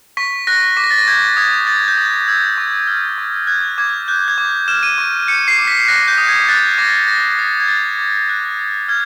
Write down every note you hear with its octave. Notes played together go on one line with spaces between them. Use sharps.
C#6 B6
F#6 A#6
D6 B6
A#6
A6
A#6
G6 G#6
D#6 G#6
G6 A6
G6
D#6 A6
G#6
E6 G#6
C#6
F6
C#6
F#6 G#6
D6 G#6
F#6 G6
G#6
D6
F6 E7
D#7
C#6
G6 C#7
C7
D6
B6
F#6 A#6
G6
D#6
G#6
F#6 A6
D6 A#6
G6 A#6
D#6
G#6
F#6 A6
D6
F#6
D#6
F6 G#6